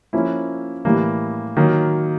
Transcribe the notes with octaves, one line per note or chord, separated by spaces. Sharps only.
F3 A#3 C#4 E4
A2 E3 G3 A#3
D#3 F#3 A#3